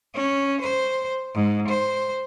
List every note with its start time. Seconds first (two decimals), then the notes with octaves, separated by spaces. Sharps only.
0.15 C#4
0.61 C5
1.34 G#2
1.68 C5